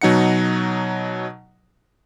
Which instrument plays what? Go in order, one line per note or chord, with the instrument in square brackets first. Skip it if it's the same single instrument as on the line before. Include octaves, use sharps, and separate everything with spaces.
[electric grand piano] B2 F#3 D#4 F#5 C#7